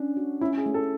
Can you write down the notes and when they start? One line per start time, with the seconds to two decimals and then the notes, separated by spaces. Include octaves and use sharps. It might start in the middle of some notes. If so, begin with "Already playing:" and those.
Already playing: C#4 D4
0.17 F#4
0.41 C#4 E4
0.57 G#4
0.66 A3
0.74 A4